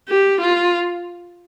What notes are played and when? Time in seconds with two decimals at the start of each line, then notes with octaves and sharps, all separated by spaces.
0.09 G4
0.41 F4